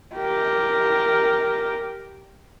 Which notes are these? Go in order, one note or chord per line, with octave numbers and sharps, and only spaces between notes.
G4 A#4